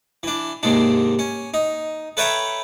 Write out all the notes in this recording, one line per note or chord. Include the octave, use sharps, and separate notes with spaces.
E3 D4
D#2 G#2 C3 D4
C#4
D#4
A4 B4 C#5 E5 G5 A#5